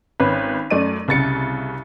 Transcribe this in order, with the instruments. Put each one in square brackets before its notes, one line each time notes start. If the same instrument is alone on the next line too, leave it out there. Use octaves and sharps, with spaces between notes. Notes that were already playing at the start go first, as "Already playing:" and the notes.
[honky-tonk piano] G#1 C#4 B4
F#2 A3 D5 D#7
C2 C#3 A6 C#7